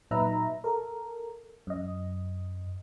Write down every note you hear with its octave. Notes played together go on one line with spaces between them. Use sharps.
A#2 F#3 D#4 B4 E5 A#5
A4 A#4
F#2 D#5